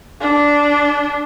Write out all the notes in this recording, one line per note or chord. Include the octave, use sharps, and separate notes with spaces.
D4